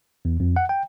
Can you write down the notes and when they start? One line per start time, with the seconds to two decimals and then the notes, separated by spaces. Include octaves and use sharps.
0.25 E2
0.40 F2
0.56 F#5
0.69 G5